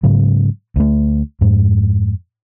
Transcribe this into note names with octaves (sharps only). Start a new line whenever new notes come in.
G#2 C#3 F#3
D2 A3
F2 G#2